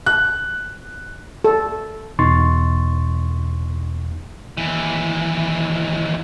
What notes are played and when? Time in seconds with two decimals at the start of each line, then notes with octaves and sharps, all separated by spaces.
0.06 F#6
1.44 A4
2.19 E2 B2 D#4 C6 C#6 A6
4.57 D#2 E3